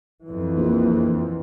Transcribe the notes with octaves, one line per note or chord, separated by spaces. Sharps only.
F2 E3
A#1